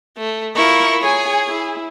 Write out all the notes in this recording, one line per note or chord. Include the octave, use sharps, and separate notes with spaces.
A3
E4 F4 A#4 C#6
G#4 C#5 G#5
E4